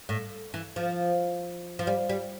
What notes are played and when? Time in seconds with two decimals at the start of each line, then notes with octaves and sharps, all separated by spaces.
0.09 A2
0.54 E3
0.76 F3
1.79 F3
1.87 G3
2.09 G3